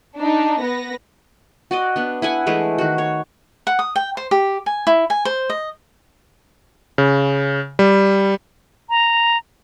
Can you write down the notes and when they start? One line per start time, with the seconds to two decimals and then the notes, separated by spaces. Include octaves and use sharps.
0.16 D4 D#4
0.60 B3 B4 A#6
1.71 F#4 D5 D#5
1.96 B3 D4
2.22 E4 F#5 G#5
2.46 E3 G#3 A3 B4
2.78 D#3 F#4
2.98 C#5
3.67 F#5
3.79 D#6
3.96 G5
4.17 C5
4.31 G4
4.66 G#5
4.87 E4
5.10 G#5
5.25 C5
5.50 D#5
6.98 C#3
7.79 G3
8.90 A#5